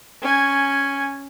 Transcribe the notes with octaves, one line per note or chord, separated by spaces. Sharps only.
C#4 G#5